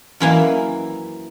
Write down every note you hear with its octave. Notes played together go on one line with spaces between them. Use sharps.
F#2 E3 A#3